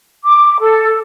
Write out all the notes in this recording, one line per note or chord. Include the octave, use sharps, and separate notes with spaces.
D6
A4